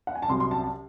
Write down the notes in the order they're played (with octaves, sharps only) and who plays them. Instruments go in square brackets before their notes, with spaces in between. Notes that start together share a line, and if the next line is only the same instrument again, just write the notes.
[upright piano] F#5
G#5
A5
C2 C3 F#3 C#4 C6
C6
A5
A5